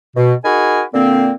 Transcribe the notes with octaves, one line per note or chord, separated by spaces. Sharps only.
B2
D#4 F#4 G#4 A#4 G#5 B5
A#2 D3 A#3 C4